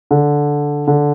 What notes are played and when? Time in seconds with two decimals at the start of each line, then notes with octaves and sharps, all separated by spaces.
0.11 D3
0.87 D3